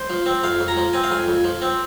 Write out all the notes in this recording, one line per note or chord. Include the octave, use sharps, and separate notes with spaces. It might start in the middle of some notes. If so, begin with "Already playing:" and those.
Already playing: C5
F3
C4
F2 F5
F2
A#5
F3
C4 G#5
F5
F2 G#5
F2
F3
C4